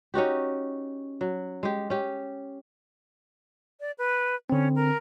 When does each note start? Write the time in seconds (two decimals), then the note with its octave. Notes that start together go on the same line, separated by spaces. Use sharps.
0.14 C#4 D#4 F#4 G4
1.21 F#3
1.63 G#3 G4
1.90 C#4 G4
3.80 D5
3.98 B4
4.50 D3 C4 C#4
4.76 A#4